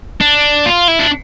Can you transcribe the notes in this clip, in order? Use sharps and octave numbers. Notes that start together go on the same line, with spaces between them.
D4
F4
E4
D4